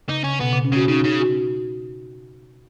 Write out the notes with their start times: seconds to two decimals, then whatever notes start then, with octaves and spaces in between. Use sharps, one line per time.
0.09 C#3 D#4
0.24 C#3 C#4
0.41 B2 B3
0.53 C#3
0.65 C#4
0.72 C#3 F#4
0.88 C#3 D#4
1.04 C#3 D#4
1.20 F#4